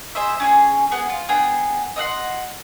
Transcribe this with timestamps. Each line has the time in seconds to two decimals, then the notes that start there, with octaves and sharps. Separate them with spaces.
0.15 G#4 C5 D#5 E5
0.40 C#4 G4 G#4
0.91 B3 G#4
1.09 F4
1.29 B3 D4 G#4 G5
1.96 D#5 E5 F#5 C6